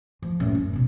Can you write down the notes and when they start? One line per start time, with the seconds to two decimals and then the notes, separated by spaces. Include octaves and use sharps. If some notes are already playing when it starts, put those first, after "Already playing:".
0.22 F3
0.40 F#2 A2
0.55 E4
0.73 E2 B2